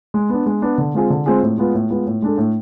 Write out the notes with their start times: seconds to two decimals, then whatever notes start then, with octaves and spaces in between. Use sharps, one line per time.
0.14 G#3
0.29 B3 D4
0.46 G#3
0.62 B3 D4
0.78 D3
0.94 G#3 C4 F4 G#4
1.10 D3
1.26 G#3 C4 F4 G#4
1.42 A2
1.58 G#3 B3 F4
1.74 A2
1.90 G#3 B3 F4
2.07 A2
2.22 G#3 D4 A4
2.38 A2